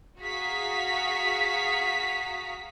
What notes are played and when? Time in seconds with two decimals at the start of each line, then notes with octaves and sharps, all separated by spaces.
0.20 F#4 G#4 F5 A#5 B6